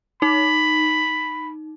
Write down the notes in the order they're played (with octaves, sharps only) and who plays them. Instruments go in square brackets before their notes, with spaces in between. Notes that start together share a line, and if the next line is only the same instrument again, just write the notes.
[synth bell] D#4 [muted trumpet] B5